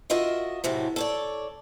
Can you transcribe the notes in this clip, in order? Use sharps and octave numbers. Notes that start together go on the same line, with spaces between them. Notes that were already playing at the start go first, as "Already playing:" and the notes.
F4 F#4 A#4 D#5 E5
A2 C3 E3 F#3
A4 C#5 D5